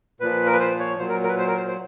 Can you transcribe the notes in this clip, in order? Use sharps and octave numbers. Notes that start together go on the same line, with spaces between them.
A#2 F3 B4
A#4
B4
C5
C#5
A#2 F#3 C5
A#4
A#4
B4
C5
A#4
C5
C5